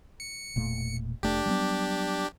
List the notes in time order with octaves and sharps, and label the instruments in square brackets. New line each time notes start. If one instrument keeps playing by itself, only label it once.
[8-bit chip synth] C#7
[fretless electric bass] E1 A#2 A3
[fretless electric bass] F1 A3 [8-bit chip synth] D4 G4
[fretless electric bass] F#3 G3 B3